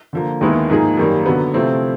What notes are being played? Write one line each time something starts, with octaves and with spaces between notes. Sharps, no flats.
D3 F3 A#3
D#2 D#3 G#3 B3 E4
G#2 F3 A#3 D#4 G#4
F#2 D#3 G3 A#3
D3 F#3 B3
C3 F3 A3 C4 E4